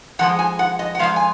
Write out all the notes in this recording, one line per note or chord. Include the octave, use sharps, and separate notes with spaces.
F2 F3 G#3 F#5
G#5
F#5
D#5
F#5
F2 F3 G#3 F5
G#5